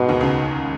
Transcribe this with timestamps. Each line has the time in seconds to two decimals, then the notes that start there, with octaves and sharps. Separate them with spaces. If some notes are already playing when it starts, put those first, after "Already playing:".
Already playing: G#2 B2 G#3
0.09 D#2 D#3
0.21 C#2 C#3